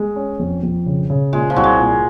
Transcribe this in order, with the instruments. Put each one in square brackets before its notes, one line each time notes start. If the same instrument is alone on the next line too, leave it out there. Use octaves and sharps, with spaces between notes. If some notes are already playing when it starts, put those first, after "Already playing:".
Already playing: [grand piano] G#3
C#4
F2
F2
C#3
C#3
[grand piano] A#2 [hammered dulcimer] G#3
[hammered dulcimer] F3
[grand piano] C2 [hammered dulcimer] F#3
[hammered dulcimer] G#3
[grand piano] A#2